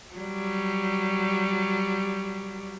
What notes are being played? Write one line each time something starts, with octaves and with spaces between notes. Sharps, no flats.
F#3 G3